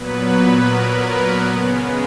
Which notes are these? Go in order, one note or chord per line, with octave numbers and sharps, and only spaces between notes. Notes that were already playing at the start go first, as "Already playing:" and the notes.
Already playing: A#2 F#3 B3 B4
A#4
C#3 G#3 B3